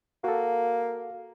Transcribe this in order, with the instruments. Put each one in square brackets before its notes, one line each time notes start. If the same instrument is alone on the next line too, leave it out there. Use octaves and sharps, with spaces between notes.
[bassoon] A#3 [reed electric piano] F#4 A4